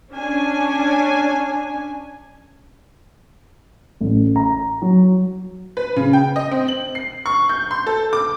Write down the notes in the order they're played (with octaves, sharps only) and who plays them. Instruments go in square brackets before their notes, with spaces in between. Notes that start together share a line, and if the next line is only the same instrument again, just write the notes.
[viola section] C#4 D4 G#5
[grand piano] A1
A#5
F#3
[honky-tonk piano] B4
C#3
G5
D#5
C4
F#7
C7
C#6
G6
C6
A4
D6